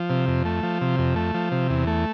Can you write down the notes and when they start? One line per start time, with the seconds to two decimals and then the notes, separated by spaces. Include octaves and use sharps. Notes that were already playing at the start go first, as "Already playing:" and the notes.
Already playing: F3
0.10 C3
0.28 F2
0.45 A3
0.63 F3
0.81 C3
0.98 F2
1.16 A3
1.34 F3
1.51 C3
1.70 E2
1.87 A3